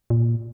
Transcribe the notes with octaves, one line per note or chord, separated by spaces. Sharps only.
A#2